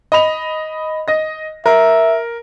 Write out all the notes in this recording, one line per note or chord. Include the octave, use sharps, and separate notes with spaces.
D#5 B5 F7
D#5 A#6
A#4 E5